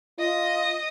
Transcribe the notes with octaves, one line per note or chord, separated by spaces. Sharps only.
F4 D#5